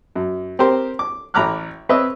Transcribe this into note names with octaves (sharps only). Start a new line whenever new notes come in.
F#2
C4 G4 A#4 C5
D6
A1 A#5 B5 D6 F6 F#6
C4 B4 C#5 D#5 E5